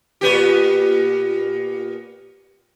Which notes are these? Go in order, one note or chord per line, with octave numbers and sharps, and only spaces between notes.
A#2 B3 G4